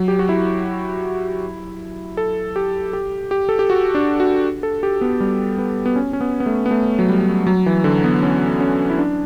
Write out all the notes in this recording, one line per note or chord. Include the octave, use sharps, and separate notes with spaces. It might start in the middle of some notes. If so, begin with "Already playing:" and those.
Already playing: F#3
G4
F#4
E4
A4
G4
G4
G4
A4
G4
F#4
D4
F#4
A4
G4
B3
G3
B3
B3
C#4
C#4
B3
B3
A3
B3
A3
F#3
G3
F#3
E3
D3
B3
C#4
C#4
E4
D4